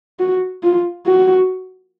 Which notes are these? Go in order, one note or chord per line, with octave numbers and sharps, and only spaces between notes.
F#4
F4
F#4